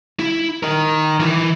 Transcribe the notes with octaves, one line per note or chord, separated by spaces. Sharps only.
E4
A#4 D#5
E3 E4